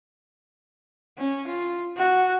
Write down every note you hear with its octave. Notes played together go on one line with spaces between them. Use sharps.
C#4
F4
F#4